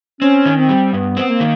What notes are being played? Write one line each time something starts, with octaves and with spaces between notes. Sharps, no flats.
C4 C#4
D#3
C4
G3
G2 B3
B3 C4
A#3
D#3